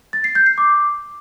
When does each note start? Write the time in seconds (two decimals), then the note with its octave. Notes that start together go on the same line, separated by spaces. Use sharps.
0.13 A6
0.24 C7
0.35 G6
0.46 C7
0.58 D6